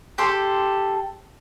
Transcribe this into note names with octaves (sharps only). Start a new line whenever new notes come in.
G4 A4 C6